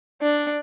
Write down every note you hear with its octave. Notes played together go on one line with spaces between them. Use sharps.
D4